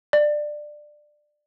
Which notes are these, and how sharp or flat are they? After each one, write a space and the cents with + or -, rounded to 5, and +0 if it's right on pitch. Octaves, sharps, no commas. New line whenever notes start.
D5 +15